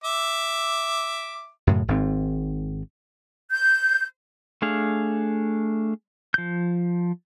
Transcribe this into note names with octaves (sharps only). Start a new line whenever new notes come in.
E5 D6
F#2 A2 C#3
G#1 G#2 C4
G6
A3 D4 G#4 F5
F3 G6